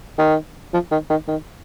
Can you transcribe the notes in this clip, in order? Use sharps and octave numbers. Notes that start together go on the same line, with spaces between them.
D#3
F3
D#3
D#3
D#3